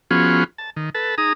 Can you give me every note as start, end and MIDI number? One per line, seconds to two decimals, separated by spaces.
0.11 0.44 53
0.11 0.44 59
0.11 0.44 61
0.11 0.44 65
0.11 0.44 66
0.11 0.44 68
0.58 0.70 81
0.76 0.90 51
0.95 1.15 69
0.95 1.15 71
0.95 1.15 81
1.18 1.33 63
1.18 1.33 68
1.18 1.33 82
1.18 1.33 87